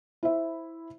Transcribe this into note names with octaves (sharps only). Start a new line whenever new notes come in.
E4 C5 E5